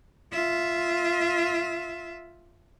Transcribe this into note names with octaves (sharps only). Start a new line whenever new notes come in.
F4 E5